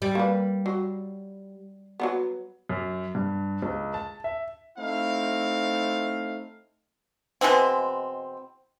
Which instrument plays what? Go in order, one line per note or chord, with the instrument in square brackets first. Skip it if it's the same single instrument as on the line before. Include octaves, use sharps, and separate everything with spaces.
[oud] G3
[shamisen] A#3 B4
F#3
F#3 A#3 B3
[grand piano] F#2
G2
C#2
A5
E5
[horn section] A3 C4 D#4 E4 F5
[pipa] B2 E3 G#3 C4